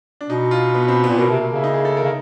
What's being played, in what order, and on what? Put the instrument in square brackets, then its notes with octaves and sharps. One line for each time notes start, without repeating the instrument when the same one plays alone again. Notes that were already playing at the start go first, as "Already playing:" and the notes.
[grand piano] D4
[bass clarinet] B2 [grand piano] D#4
[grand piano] F4
B3
C4
[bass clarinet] A#2 [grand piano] B3
[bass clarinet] B2 [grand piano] A#3
[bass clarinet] C3
B2
[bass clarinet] C#3 [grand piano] E4
[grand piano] D#4
G#4
A4
A#4
[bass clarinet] C#3